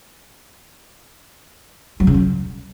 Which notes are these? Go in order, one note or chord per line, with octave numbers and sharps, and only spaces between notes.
F#3
C#3
F#3